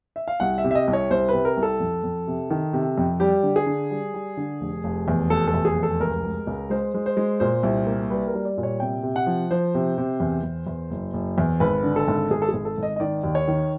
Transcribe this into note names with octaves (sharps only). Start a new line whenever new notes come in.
E5
F5
C2 F#5
E5
C3
E5
D#5
C2
C#5
C2 C5
C3 B4
A#4
C2
A4
F2
F2
C3
D#3
C3
F2
G3 G4
D3
G#4
D3
G3
G3
D3
F1
F1
E2
F1 A4
A4
E2
G#4
F1
A4
C#2 A#4
G#3
C#2
G#3 C5
G#3
C5
G#3
A#2 C5
C2
A#3
G3 B4
A#4
G3
D5
A#2
C#5
C3 G5
C3
F#5
F3
F3 C5
C3
C3
E2
E2
E2
F#1
F#1
E2
G#1 B4
D3
A4
G#1
G#1 G#4
A4
G#1 G#4
A4
G#1 D#5
D#5
D#3 D5
D#2
C#5
D#3